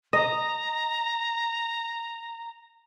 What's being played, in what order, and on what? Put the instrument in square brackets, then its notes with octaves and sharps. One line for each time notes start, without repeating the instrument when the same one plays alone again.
[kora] D#5 [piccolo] A#5